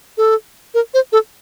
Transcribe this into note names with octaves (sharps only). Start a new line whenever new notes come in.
A4
A#4
C5
A4